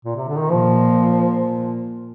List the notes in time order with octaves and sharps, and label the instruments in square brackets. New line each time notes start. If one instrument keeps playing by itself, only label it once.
[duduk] A#2
C3
D3
D#3
[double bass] A#2 [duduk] F3